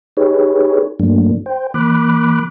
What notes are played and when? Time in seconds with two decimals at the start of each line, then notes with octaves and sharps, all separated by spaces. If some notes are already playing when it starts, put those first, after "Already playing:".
0.17 D#4 G4 G#4 B4 C#5
1.00 G2 F#3 A3 A#3 D4
1.46 C5 G5
1.74 E3 A#3 B5 D6 F#6